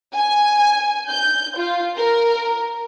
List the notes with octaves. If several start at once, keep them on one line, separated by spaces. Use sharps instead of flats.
G#5
G6
F4
A#4